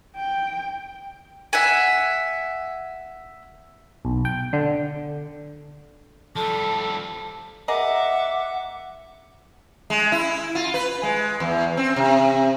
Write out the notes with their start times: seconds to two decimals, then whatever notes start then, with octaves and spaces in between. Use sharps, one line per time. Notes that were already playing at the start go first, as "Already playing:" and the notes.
0.17 G5
1.53 E5 F#5 G#5
4.05 B1
4.25 G5
4.53 D3
6.36 F3 G3 A4 A5
7.68 G#4 A#4 D#5 E5 F#5 D6
9.90 G#3
10.12 E4
10.55 F4
10.74 B4
11.03 G#3
11.40 E2
11.77 C4
11.96 C3